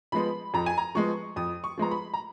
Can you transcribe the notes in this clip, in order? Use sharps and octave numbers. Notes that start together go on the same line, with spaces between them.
F3 G#3 B3 B5
F2 A#5
G#5
A#5
F3 G#3 B3 C#6
F2 D#6
C#6
F3 G#3 B3 A#5
B5
A#5